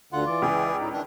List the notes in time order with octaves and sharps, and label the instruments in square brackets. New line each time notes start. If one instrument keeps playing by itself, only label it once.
[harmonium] D2 D3 F#5 [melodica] F4
[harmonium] E3 [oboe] D5
[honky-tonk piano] C#2 [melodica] G#4
[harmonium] A2 D#4
[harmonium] D#3 E3 [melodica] D4